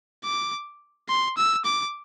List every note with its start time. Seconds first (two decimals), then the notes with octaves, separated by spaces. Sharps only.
0.24 D6
1.09 C6
1.36 E6
1.64 D6